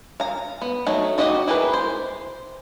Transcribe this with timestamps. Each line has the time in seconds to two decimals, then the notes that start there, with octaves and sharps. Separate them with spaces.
0.20 F5 A#5
0.61 B3
0.87 F#3 A3 D#4
1.18 D#4 F#4 G4 D#5 F#5
1.48 E4 G4 G#4 A#4 B4
1.74 C5